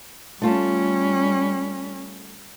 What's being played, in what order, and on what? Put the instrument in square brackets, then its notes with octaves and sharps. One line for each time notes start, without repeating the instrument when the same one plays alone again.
[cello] G3 C#4 [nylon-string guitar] A3 F4 A4